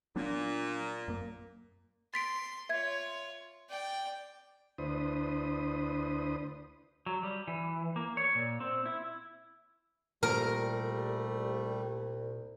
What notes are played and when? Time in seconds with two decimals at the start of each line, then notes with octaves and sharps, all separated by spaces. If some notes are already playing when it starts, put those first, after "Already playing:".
0.16 A#2 F#3 B3 D4
1.08 F#2 A#3
2.14 C6 A6 B6 D7
2.69 F4 C#5 E5 G#6
3.70 D5 G5
4.78 D2 D4 E4 B4 C5 D#6
7.06 F#3
7.23 G3
7.48 E3
7.96 A#3
8.17 C#5
8.35 A#2
8.60 C4
8.86 E4
10.23 C2 A#2 G3 A3 A#4